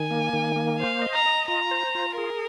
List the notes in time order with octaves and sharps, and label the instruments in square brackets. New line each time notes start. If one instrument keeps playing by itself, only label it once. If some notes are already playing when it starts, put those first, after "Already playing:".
Already playing: [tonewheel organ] D#3 [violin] G#5
[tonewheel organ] A#3
D#3
A#3
[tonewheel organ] C5 [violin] F5
[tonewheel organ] D#5
[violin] A#5
[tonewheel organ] D#5
[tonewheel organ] F4 [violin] A#5
[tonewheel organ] C5
F4
[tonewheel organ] G#4 [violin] A#4